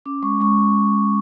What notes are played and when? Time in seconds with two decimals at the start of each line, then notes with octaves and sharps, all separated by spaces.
0.06 C#4 D6
0.23 G#3 C#6
0.40 G#3 C#6